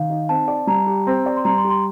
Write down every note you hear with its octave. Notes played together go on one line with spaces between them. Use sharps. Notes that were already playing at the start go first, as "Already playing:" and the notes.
Already playing: D#3 F5
D#4
C4 A5
D5
G3 A#5
G4
C4
D5
C6
G3 A#5
C6
G4
C6